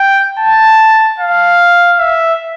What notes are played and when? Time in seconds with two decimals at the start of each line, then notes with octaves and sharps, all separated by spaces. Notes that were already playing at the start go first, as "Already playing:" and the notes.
Already playing: G5
0.39 A5
1.20 F5
1.99 E5